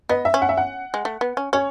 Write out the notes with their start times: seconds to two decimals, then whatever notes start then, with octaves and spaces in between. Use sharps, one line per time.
0.09 B3 D#5
0.25 E5
0.34 C#4
0.42 F#5
0.49 E5
0.57 F#5
0.94 G#3
1.05 A3
1.21 B3
1.37 C#4
1.53 C#4 C#5